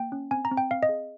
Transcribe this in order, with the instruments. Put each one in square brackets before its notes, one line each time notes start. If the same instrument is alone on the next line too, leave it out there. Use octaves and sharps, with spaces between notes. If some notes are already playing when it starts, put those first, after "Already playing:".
Already playing: [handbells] A#3 G5
C#4
C4 G#5
A#5
C4
G5
C4 F5
D#5
G#4